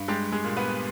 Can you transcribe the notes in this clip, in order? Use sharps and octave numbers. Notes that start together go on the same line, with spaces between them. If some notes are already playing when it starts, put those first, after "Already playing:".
Already playing: G2
G3 G#3 G4
G#3 G#4
A#2
B3 B4